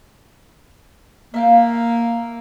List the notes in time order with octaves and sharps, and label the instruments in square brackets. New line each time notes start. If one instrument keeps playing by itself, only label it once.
[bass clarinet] A#3 [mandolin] E5 F5 G5